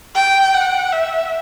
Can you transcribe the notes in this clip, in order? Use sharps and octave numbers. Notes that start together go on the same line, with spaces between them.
G5
F#5
E5